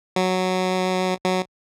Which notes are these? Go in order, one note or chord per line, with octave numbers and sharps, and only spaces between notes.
F#3
F#3